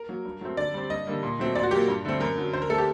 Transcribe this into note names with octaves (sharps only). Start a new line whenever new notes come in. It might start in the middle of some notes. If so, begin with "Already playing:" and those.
Already playing: A#4
F#3 A#3
G2
F#3 A3 C4
D3 D5
G3 C4
G2 D#5
D3 G3 A#3
A#2
F#3 A3 C4
A#2 D5
F#4
F#3 A#3 G4
G2
D3 A3 C4
F#2 A#4
D3 F#3
D3 C5
A#4
A3 C4 A4
G4